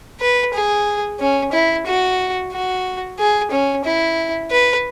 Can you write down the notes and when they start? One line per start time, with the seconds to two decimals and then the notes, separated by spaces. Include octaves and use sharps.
0.21 B4
0.54 G#4
1.20 C#4
1.52 E4
1.86 F#4
2.52 F#4
3.19 G#4
3.51 C#4
3.85 E4
4.51 B4